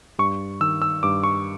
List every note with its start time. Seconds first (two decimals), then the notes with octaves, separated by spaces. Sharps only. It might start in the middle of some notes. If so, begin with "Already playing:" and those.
0.19 G2 C#6
0.60 D#3 E6
0.82 E6
1.03 G2 D6
1.24 C#6